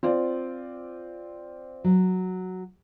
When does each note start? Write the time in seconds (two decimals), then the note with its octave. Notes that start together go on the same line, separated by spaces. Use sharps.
0.03 C4 F4 D5
1.84 F#3